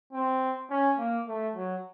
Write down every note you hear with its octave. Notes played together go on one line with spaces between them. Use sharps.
C4
C#4
A#3
A3
F#3